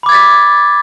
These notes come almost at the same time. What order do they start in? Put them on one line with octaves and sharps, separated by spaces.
B5 D6 G#6 A6 B6